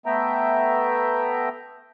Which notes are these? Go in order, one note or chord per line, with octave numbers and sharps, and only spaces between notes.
A3 B3 E5 G5 A#5